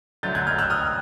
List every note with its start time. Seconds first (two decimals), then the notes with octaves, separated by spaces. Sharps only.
0.23 D3 F#3 A3 G6 A6
0.35 F#6 G#6
0.47 F6 G6
0.58 E6 F#6
0.70 D#6 F6